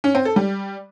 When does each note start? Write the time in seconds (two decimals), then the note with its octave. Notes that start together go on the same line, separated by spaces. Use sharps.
0.04 C#4
0.15 C4
0.25 A4
0.36 G3